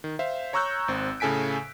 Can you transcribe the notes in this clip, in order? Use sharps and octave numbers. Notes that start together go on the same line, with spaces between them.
D#3
C5 E5 F5
C#5 A#5 C#6 E6 F#6 G6
G#1 C4
A2 C#3 A4 G#5 B6 D7